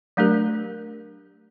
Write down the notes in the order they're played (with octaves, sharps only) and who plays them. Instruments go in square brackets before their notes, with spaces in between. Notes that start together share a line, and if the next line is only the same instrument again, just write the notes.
[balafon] F#3 A3 D4 G4 A#4